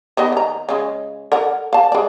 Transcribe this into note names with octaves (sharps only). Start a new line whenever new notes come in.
D#3 B3 D#5
D#3 A#5
C#3 G#3
A4 A#4 F#5
F5 A5
G#3 D5